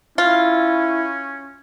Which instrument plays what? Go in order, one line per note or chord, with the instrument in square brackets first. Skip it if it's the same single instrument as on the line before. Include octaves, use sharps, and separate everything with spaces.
[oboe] C#4 [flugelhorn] E4 [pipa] F4